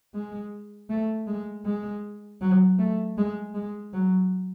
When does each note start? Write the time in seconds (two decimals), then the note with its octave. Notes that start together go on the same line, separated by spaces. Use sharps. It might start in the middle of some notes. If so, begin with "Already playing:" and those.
0.14 G#3
0.90 A3
1.27 G#3
1.65 G#3
2.41 F#3
2.79 A3
3.18 G#3
3.54 G#3
3.93 F#3